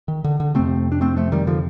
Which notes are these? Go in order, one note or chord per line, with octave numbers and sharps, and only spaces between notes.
D#3
D3
D3
F2 C3 A3 C4
D4
A3 C4
F3 A3
D#3 G3
D3 F3